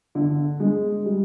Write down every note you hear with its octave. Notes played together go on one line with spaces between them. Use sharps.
D3
G#3
G3